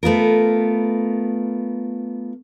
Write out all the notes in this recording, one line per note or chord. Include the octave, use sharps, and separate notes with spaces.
A3 B3 F4 A#4